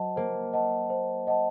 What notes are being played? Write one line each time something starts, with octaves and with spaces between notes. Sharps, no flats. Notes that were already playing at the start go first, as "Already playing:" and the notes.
Already playing: F#3 C5 D#5 F#5 A5
A#3 C5
D#5 F#5 A5
C5
D#5 F#5 A5